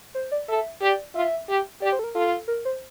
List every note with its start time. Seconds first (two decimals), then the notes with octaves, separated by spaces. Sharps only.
0.15 C5
0.32 D5
0.48 A4 E5
0.81 G4 D5
1.15 F4 E5
1.48 G4
1.81 G4 D5
1.92 C5
1.99 A4
2.04 A#4
2.15 F4 A4
2.48 A#4
2.65 C5